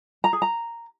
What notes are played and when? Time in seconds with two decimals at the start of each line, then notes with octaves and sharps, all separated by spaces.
0.24 A#5
0.33 G#4
0.42 A#5